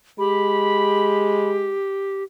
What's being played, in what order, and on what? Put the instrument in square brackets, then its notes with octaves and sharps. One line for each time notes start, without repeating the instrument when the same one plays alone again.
[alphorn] G#3 [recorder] G4 [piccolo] B5